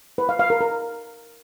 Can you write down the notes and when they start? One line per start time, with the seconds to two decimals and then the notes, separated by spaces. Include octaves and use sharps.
0.18 B4
0.29 F5
0.39 F5
0.50 A#4
0.61 A#4